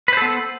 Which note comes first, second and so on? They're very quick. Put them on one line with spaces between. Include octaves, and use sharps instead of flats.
B4 C5 A4 B3